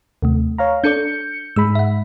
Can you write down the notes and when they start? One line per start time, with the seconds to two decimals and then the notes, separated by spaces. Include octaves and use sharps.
0.22 D#2 C3 A3
0.58 C#5 F5 A#5
0.84 D4 A4 D5 G6 C#7
1.56 G#2 G#3 B5 E6
1.75 E5 F#5